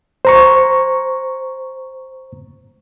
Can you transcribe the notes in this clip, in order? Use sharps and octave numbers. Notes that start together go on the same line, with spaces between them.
C5 A#5 C#6